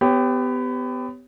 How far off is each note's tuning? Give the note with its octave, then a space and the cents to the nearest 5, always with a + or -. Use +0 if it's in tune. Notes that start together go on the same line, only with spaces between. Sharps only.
B3 +30 G4 +0 C#5 +0